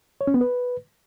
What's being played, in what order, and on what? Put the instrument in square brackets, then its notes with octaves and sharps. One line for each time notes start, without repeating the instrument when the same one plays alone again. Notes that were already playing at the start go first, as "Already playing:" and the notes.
[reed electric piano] C#5
C#4
B3
B4